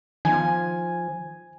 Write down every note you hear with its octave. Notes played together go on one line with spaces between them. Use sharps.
D#3 F3 G#5